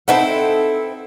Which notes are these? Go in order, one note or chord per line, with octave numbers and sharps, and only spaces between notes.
C4 D#4 E4 A4 B4 F#5